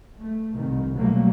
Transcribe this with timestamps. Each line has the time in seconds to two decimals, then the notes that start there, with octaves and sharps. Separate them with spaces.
0.18 A3
0.54 C2 D#3
0.95 B2 F#3 G3 A3 A#3